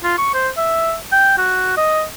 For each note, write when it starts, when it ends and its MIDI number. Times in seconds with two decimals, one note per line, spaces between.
0.04 0.14 65
0.18 0.32 85
0.34 0.49 72
0.57 0.95 76
1.12 1.38 79
1.38 1.75 66
1.77 2.04 75